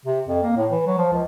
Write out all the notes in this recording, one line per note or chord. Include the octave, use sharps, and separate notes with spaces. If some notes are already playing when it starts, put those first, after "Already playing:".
C3
F2
A#3
A2
E3
F#3
F3
C#2